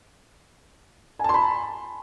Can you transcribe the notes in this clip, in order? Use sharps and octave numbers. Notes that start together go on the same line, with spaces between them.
G#5 A5 B5 C6